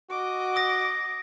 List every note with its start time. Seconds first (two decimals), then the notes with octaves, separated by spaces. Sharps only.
0.10 F#4 D#5 D6
0.56 D#6 A#6